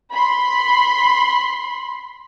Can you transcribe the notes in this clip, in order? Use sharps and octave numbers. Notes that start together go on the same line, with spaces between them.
B5 C6